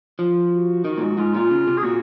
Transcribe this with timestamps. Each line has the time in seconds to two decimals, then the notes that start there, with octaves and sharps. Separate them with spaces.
0.19 F3
0.52 F#4
0.85 D#3
0.98 A#2
1.02 G#2
1.18 G#2 F4
1.34 A#2 F4
1.51 C#3
1.67 C3
1.77 G#4
1.84 A#2 F#4